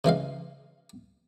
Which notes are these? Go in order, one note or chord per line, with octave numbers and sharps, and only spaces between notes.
C#3 E3 G#3 F5